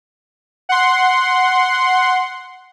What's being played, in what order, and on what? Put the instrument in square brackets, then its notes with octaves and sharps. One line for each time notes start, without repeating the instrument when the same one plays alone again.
[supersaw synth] F#5 C6